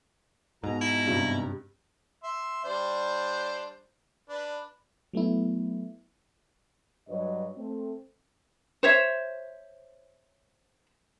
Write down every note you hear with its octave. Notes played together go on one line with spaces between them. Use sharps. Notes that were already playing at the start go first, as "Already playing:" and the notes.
G#2 B2 A#5
E4
G2 C3 G3
E5 C6
G3 D4 C5
D4 B4
F#3 A3 B3 E4
G2 F#3 G3 B4 C#5 D#5
A3 C4
C5 C#5 E5